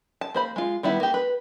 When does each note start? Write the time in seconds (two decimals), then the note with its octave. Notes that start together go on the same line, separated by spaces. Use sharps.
0.21 A5
0.34 A#3 C5 B5
0.56 G#3 F4
0.83 D#3 G3 B3 E4
1.00 A#3 G4
1.14 B4